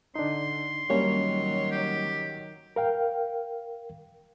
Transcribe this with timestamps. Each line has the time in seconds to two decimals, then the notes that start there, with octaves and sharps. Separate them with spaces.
0.16 D3 D4 D#4 C6
0.90 D#3 F#3 G3 A#3 C#4 C#5
1.72 G4
2.76 A#4 F5 G5